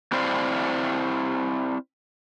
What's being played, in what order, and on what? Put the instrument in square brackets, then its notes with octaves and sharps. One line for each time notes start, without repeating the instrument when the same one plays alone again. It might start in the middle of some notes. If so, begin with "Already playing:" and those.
[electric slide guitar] C4 E4 C5 D5 F5